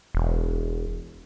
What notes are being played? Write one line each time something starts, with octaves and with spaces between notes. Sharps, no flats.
E1